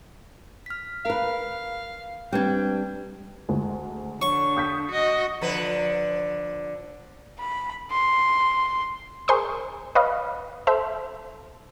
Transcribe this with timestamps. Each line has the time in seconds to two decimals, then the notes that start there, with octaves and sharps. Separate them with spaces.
0.66 F6 B6
1.05 A#4 B4 F5
2.33 G3 C4 D4 B4 G5 G#6
3.49 D2 G#3
4.22 D3 C#5 C#6
4.56 D#6 G6 B6
4.91 F#4 D#5
5.41 D3 F3 B4
7.40 B5
7.92 C6
9.28 G#4 A#4 C5 C6 C#6 D#6
9.95 B4 C#5 D#5 F5
10.67 A4 C5 E5